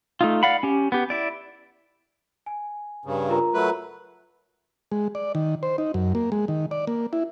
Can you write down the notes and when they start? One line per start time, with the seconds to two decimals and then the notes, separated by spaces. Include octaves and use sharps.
0.21 A3 D#4 F4
0.43 D5 F5 F#5 B5
0.63 C#4 G4
0.92 B3 G4
1.10 E4 D5
2.46 G#5
3.05 G2 C#3
3.29 F4 A#4 A#5
3.54 F#3 A3 B4
4.92 G#3
5.15 D5
5.35 D#3
5.63 C5
5.78 D#4
5.94 F#2
6.15 A#3
6.32 G#3
6.48 D#3
6.71 D5
6.87 A#3
7.13 E4